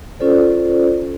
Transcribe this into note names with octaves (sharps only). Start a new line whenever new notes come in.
C#4 F4 A4 C5 D5